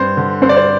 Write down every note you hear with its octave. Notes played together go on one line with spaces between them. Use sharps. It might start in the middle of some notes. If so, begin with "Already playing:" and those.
Already playing: G2 C5
D3
G2 C5
D5
C5